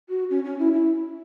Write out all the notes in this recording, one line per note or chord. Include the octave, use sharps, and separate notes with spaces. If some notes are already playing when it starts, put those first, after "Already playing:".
F#4
C#4
C#4
E4
E4